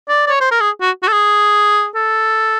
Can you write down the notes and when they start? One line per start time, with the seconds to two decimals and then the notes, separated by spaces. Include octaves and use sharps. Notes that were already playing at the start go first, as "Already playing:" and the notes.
0.09 D5
0.26 D5
0.30 C#5
0.41 C5
0.51 A#4
0.61 G#4
0.81 F#4
1.03 F#4
1.08 A4
1.13 G#4
1.95 A4